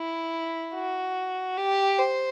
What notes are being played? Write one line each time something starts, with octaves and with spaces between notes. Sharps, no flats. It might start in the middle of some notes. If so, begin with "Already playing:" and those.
Already playing: E4
F#4
G4
C5